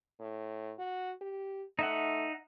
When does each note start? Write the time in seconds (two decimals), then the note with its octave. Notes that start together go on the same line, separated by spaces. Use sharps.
0.20 A2
0.79 F#4
1.21 G4
1.79 A3 D#4 E5 F#5